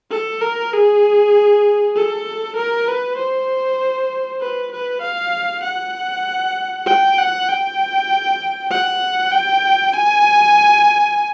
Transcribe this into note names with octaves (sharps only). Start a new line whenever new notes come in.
A4
A#4
G#4
A4
A#4
B4
C5
B4
B4
F5
F#5
G5
F#5
G5
F#5
G5
G#5